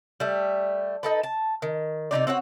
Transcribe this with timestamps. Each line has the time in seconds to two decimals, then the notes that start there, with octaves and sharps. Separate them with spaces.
0.20 G3 A3
1.03 D#4 A4 B4
1.23 A5
1.62 D#3
2.11 C3 E3 D#4 D5
2.27 C4 F#4 C#5 F#5